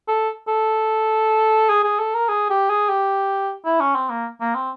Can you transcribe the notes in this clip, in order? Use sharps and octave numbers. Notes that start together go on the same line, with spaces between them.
A4
A4
G#4
G#4
A4
A#4
G#4
G4
G#4
G4
E4
C#4
C4
A#3
A#3
C4